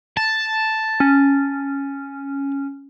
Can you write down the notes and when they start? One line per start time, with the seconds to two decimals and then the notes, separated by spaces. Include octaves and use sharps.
0.17 A5
1.00 C#4